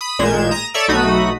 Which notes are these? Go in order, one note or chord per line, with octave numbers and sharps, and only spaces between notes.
B5 D#6
A1 A#2 G#3 G6 G#6 E7
A#5 D#6 A#6 E7
A4 C#5 D5 E5 E6 D7
B1 A3 D#4 F#4 B5 D#6